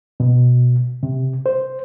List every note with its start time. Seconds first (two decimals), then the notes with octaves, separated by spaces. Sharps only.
0.20 B2
1.03 C3
1.46 C5